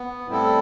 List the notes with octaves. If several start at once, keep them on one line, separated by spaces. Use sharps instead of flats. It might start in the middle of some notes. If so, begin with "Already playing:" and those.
Already playing: B3
A2 G3 C4 E4 A4